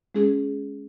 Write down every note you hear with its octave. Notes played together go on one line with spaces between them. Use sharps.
G#3 C#4 G#4